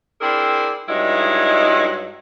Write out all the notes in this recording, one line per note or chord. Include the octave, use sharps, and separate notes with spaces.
C4 D4 E4 G#4 A#4
G2 F#3 G#3 D#4 E4